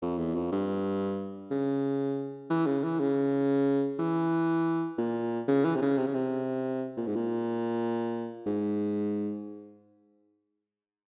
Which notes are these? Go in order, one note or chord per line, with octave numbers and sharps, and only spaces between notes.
F2
E2
F2
G2
C#3
E3
C#3
E3
C#3
E3
A#2
C#3
E3
C3
C#3
C3
C#3
C3
A#2
G#2
A#2
G#2